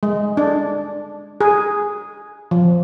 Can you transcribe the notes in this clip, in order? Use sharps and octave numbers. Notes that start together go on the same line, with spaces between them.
G#3
D4
G#4
F3